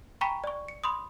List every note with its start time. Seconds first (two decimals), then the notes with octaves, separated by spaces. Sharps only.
0.21 G5 G#5 A#5 B5 C#6 B6
0.44 D5 C#6
0.68 C#7
0.84 B5 C6 D#6